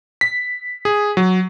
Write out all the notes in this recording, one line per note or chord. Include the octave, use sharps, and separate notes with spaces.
B6
G#4
F#3